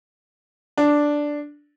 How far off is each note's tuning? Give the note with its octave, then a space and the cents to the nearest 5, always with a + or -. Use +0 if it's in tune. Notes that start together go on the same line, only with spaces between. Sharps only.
D4 +0